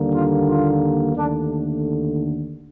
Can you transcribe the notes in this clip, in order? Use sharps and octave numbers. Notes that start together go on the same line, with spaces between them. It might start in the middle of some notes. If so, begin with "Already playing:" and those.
Already playing: D#2 D3 G3 A#3
F4
F4
D#2 D3 A3 D4